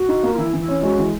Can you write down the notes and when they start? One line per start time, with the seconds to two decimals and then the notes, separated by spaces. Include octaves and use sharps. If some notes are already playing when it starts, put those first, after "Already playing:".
Already playing: F#4
0.09 D#4
0.23 A#3
0.33 F4
0.38 E3 E4
0.53 E3
0.60 E4
0.68 C#4
0.83 G#3 F#4
0.98 E3